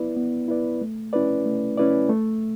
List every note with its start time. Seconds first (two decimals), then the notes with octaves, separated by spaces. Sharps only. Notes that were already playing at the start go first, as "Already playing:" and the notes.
Already playing: B3 E4 B4 D5
0.16 B3
0.48 E4 B4 D5
0.82 A3
1.13 C#4 E4 B4 D5
1.46 A3
1.78 C#4 E4 B4 D5
2.09 A3